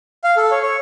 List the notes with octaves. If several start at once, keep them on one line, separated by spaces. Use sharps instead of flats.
F5
A4
C#5
C#5